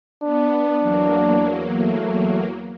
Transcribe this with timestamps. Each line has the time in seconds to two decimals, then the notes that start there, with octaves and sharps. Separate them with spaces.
0.23 B3 D4
0.80 E2 F#3 A#3
1.79 A3